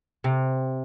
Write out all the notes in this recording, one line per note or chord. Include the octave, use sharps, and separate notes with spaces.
C3